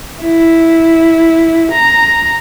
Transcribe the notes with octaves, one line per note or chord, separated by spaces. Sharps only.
E4
A#5